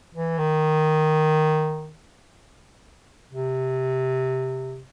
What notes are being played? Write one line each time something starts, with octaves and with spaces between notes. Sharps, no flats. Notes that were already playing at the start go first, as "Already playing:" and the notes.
E3
D#3
C3